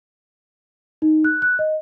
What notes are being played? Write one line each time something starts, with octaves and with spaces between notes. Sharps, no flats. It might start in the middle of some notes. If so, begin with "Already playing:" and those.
D#4
F#6
F#6
D#5